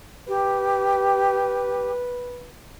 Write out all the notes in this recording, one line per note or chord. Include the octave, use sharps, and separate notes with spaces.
G4 B4